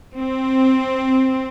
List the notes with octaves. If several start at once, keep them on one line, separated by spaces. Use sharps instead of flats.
C4